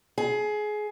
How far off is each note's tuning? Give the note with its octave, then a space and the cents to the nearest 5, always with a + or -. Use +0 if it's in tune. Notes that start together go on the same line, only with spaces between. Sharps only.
G#4 +20